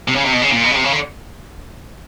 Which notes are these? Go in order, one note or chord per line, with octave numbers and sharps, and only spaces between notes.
C3
C#3
C3
B2
C#3
A#2
B2
C#3
C3
C#3
D3